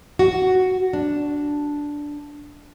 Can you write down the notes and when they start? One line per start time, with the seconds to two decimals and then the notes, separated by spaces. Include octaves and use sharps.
0.19 F#4
0.93 D4